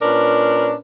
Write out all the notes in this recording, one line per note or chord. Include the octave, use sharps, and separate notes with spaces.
A#2 C#4 D4 A#4 B4